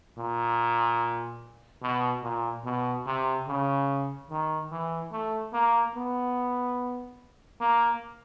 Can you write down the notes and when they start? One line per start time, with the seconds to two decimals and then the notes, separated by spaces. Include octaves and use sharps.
0.18 A#2
1.82 B2
2.23 A#2
2.64 B2
3.06 C3
3.48 C#3
4.30 D#3
4.72 E3
5.12 A3
5.53 A#3
5.95 B3
7.61 A#3